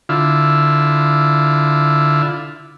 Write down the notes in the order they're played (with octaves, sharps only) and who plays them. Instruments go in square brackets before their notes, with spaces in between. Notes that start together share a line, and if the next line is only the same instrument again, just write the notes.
[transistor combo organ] D3 E4 F4